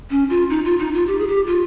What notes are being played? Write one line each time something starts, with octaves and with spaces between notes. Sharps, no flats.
C#4
F4
D#4
F4
D#4
F4
G4
G#4
G4
F4